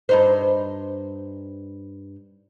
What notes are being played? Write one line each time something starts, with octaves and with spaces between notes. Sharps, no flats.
G2 D#4 C5